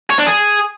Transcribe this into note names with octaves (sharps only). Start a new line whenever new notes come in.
C#5
D4
G#4